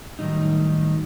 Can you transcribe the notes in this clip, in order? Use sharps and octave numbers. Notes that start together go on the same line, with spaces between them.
A2 D#3 F#3 G3 D#4